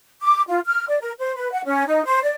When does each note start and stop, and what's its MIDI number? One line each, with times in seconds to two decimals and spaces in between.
0.22 0.42 86
0.47 0.59 65
0.65 0.85 89
0.88 0.98 74
1.01 1.12 70
1.19 1.35 72
1.36 1.51 71
1.52 1.64 78
1.64 1.84 61
1.87 2.02 63
2.05 2.22 72
2.23 2.35 74